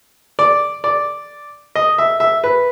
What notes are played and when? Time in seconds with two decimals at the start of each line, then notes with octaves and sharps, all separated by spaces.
0.39 D5
0.84 D5
1.75 D#5
1.98 E5
2.20 E5
2.44 B4